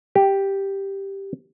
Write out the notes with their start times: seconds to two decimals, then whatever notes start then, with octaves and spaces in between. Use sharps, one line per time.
0.15 G4